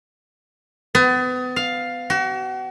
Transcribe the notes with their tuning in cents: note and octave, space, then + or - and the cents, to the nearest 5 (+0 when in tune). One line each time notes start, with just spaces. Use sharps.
B3 +35
F5 +10
F#4 +40